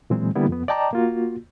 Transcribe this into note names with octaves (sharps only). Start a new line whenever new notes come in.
A#2 E3 F#3 G#3 C4
D3 G3 A#3 B3 E4
F2 B3
D5 D#5 G5 A5 A#5 D6
A#3 F4 F#4